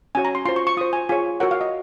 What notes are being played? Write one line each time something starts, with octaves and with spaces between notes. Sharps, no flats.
C#4 F#4 C#5 G#5
A#5
C6
F4 C5 C6
C#6
C#6
F4 C5 D#6
G#5
F4 G#4 C#5 G#5
F#4 A#4 C#5 F#5
F5
D#5